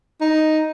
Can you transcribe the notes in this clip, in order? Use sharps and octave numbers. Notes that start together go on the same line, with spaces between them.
D#4